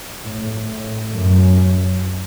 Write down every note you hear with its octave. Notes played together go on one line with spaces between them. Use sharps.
A2
A2
F#2